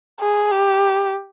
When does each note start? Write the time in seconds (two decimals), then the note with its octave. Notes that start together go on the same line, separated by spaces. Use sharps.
0.20 G#4
0.51 G4